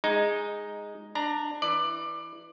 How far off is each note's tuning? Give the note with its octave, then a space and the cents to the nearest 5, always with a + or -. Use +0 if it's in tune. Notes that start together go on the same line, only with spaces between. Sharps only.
G#3 -5 D#4 +0
D4 +15 A#5 +0
E3 +0 D5 +20